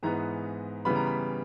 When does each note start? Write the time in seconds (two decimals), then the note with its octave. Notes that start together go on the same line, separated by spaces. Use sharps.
0.03 G#2 E3 G#3 B3 A#5
0.85 C#3 E3 G3 B3 B5
0.96 A#5
1.07 B5